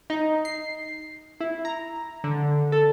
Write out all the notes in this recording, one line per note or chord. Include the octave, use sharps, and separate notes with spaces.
D#4
C7
E4
A#5
D3
A4